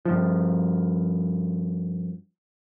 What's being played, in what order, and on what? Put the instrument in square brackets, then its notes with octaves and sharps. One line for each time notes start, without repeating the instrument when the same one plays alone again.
[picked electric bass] G2 F3